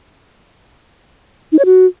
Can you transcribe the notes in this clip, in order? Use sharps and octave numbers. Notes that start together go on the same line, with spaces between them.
D#4
C#5
F#4